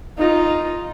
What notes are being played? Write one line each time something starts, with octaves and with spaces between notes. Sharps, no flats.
D#4 F4